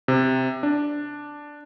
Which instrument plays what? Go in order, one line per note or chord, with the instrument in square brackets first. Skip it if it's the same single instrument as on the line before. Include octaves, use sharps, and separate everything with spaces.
[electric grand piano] C3
D4